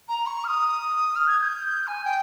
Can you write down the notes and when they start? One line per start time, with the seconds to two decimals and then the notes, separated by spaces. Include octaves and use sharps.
0.08 A#5
0.26 C#6
0.44 F6
0.48 D#6
1.15 F6
1.27 G#6
1.39 G#6
1.42 G6
1.87 G#5
2.05 G5